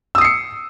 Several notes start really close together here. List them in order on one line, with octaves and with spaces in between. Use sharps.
E6 D#6 C7 C#7